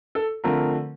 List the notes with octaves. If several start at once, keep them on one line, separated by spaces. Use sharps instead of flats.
A4
D3 F3 A3 C4 A#4